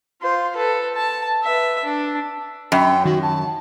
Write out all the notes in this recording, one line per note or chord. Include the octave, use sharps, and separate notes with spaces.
F4 C5
A4 B4
A5
B4 E5
D4
F#2 G5
D#3 F#4
A5